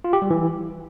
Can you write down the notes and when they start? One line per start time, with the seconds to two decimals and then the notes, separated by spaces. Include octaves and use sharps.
0.04 F4
0.13 G4
0.22 G3
0.30 E3